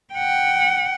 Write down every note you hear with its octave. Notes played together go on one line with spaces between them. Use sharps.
F#5 G5